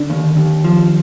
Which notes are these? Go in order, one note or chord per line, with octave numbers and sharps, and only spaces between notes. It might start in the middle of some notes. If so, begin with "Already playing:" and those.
Already playing: D3
D#2
D#2
F3